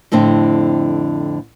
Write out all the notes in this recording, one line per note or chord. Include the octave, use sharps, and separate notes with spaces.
F2 A2 D3 C4